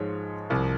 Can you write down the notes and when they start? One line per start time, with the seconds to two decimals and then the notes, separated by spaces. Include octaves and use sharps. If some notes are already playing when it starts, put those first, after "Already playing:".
Already playing: G#2 F3 G#3 C#5
0.50 C2 C3 F3